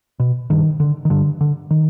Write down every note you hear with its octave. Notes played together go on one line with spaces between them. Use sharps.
B2
G2 D#3
D3
D#3
G2 D3
D3
D#3